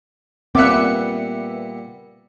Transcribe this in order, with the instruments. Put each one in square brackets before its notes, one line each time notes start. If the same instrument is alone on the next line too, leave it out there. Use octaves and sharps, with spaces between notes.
[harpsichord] A#2 G3 [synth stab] B3 E5 C#7 [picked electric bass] C4 [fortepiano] D6 F#6